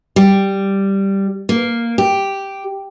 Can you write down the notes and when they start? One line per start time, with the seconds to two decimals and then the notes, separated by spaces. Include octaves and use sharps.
0.16 G3
1.49 A#3
1.98 G4